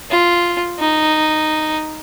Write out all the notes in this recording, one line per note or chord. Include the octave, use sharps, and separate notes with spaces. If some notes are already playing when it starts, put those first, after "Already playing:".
F4
D#4